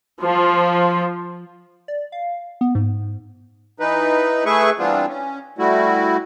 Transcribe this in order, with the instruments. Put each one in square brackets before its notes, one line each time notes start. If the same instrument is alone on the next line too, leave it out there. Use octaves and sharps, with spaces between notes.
[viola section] F3
[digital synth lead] D5
F5
B3
G#2
[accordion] E3 D#4 B4
A3 G#4 B4 E5 C#6
E3 G3 B3 C4 D4 F4
C#4
G3 A3 E4 F#4